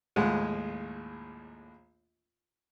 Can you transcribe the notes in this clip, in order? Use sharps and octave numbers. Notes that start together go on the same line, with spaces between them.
A#1 D#2 A2 G#3 F#5